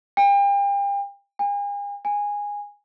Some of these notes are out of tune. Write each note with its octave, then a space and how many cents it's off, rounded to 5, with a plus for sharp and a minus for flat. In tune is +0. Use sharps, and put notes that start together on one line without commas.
G5 +40
G#5 -40
G#5 -15